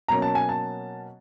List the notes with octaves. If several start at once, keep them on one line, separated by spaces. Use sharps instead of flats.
B2 F#3 A#3 C#4 A#5
A5
G#5
A5